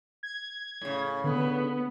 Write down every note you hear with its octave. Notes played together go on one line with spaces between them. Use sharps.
G#6
A2 C#3
D3 B3